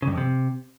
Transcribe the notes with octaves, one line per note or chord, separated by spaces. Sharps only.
C#3
G2
F2
C3